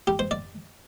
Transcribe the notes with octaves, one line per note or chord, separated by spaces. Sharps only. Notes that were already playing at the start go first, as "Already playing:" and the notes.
G4
C5
D5